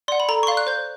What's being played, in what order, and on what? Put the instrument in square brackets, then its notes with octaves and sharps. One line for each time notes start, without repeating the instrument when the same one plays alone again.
[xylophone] D5 F#5 C6
B5
A4 A#5
C#6
D5 F5 C6
F#6
C5 G6